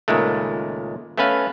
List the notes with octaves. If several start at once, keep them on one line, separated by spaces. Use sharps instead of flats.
C#2 A#2 D#3 G#3 A3
A3 B3 C#4 B4 F5